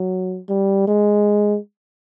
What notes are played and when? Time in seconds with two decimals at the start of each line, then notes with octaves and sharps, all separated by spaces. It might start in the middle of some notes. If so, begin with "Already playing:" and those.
Already playing: F#3
0.49 G3
0.88 G#3